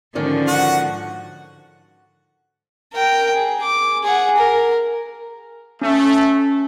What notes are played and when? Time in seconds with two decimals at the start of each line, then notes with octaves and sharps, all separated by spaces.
0.15 G#2 D3 D#3 F3 C#4 D5
0.47 F#4 F#5
2.93 A#4 G5
3.34 G#4
3.62 D6
4.04 G#4 F#5
4.37 A#4
5.82 A3 C#4